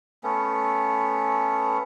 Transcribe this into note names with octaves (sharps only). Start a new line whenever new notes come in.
A3 B3 C#4